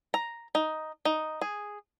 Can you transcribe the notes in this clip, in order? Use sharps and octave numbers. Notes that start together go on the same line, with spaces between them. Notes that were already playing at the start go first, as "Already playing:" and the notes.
A#5
D#4
D#4
G#4